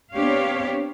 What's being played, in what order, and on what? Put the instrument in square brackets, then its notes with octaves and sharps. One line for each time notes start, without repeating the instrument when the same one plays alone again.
[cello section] B3 C4 D4 G4 C#5 F5